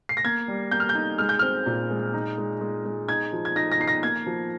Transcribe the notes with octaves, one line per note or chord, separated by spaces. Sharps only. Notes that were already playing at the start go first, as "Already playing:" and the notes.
C7
A#6
A#3 G#6
G3
A#3 G6
F6
G6
D#4
G#3 F6
G6
C4 F6
A#2
G#3
D#4
G#3
G#3
G#3
D#4 G#6
F3
G#6
D#4 A#6
A#6
D#4 C7
A#6
A#3 G#6
F3